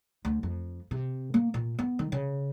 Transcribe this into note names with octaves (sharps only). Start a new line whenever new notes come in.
D2
F2
C3
A#3
A#2
B3
D#3
C#3